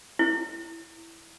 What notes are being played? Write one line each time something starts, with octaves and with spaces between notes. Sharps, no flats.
E4